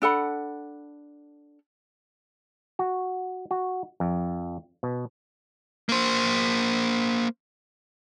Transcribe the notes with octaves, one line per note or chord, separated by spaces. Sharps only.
D4 A4 F#5 B5
F#4
F#4
F2
B2
A#3 C5